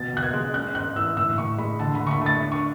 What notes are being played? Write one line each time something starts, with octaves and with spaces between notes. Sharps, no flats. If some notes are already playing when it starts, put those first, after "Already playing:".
Already playing: B2 A6
B2 F#6
G#6
G#3
C#4 F#6
G#2 F#6
E3 E6
A2 E6
A2 C#6
G#3 B5
D3 A5
D3 B5
C#6
B5
A3 A6
D4
C#6